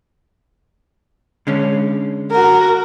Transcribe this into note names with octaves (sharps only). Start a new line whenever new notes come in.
D3 G#3 C#4
F#4 A#4